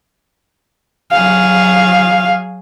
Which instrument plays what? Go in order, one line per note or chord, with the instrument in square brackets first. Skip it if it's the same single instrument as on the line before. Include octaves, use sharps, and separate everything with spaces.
[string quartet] F#3 G#4 [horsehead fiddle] F5